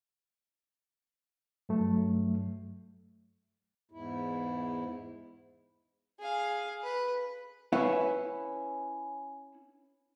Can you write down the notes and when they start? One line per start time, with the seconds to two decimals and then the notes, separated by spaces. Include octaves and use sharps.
1.69 G2 F#3 A3
3.91 E2 G#2 E4
6.19 G#4 F5
6.83 B4
7.73 C#4 E4 B4 C#5 E5 F5